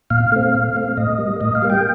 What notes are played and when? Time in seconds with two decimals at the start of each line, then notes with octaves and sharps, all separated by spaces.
0.10 A#2 F5
0.32 A3 C4
0.54 A#2
0.75 A3 C4
0.97 A2 D#5
1.18 G3 A#3
1.41 A2 D#5
1.55 F5
1.62 G3 A#3
1.70 G5